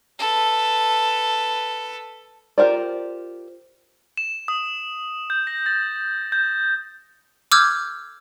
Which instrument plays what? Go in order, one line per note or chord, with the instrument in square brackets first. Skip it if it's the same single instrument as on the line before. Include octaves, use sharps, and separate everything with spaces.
[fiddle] A4 B4
[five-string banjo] F4 G4 A#4 C5 D5
[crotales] E7
D#6
G6
A#6
A6
G6
[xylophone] D6 E6 F6 G6 G#6